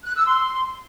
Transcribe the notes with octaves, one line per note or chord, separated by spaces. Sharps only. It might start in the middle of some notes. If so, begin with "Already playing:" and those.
F#6
E6
C6